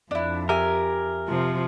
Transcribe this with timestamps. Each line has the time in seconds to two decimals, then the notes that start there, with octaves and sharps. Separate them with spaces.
0.11 F2 D4 E4
0.49 G4 A#4 E5 G#5
1.27 C3 F3